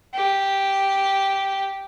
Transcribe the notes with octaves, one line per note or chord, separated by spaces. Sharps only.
G4